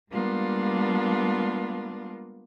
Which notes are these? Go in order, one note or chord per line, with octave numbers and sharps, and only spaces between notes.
G3 G#3 A#3 B3 D4 F4